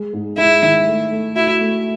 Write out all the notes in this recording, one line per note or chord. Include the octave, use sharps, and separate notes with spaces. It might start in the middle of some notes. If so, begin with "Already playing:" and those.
Already playing: G#3
G#2
G#3 E4
D#3
A3
A3
E4 F#4
A3